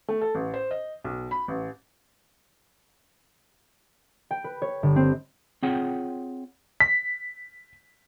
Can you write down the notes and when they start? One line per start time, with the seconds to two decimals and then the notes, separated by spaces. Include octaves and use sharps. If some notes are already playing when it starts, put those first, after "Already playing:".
0.08 A3
0.21 A4
0.35 A1
0.54 C5
0.71 D#5
1.04 B1
1.31 B5
1.48 A1
4.31 G5
4.44 B4
4.62 C#5
4.83 G1
4.96 C4
5.63 C4 F4 G#4 C#5 F#5 G5
6.80 B6